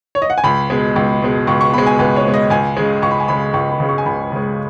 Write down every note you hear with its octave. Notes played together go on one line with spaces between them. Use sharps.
C#5
D#5
F#5
G#5
C#2 B5
B2 G#3
C#2
B2 G#3
C#2 C#6
C#6
B2 G#3 B5
G#5
C#2 B4
C#5
B2 G#3
D#5
C#2 G#5
C#3 G#3
C#2 C#6
B5
G#5
C#3 G#3 B5
C#2 C#6
B5
C#3 G#3
C#6
G#5
C#2 B5
C#3 G#3